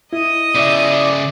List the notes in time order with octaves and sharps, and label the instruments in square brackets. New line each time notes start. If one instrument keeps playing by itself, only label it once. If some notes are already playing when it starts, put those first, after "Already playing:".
[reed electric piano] E4 [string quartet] D#5 D#6
[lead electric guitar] C#3 E5 [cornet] D5